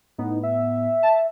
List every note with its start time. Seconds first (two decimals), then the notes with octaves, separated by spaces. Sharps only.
0.18 A2 B3 D#4
0.43 E5
1.03 A5